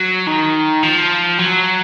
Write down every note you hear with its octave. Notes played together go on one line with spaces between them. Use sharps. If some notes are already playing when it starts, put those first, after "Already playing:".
Already playing: F#3
D#3
F3
F#3